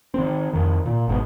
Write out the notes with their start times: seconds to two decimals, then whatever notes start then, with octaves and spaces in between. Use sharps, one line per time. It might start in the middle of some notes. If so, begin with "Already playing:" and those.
0.14 D#3 C4
0.53 F2 D#3
0.86 A#2
1.07 G#1 G#2 B2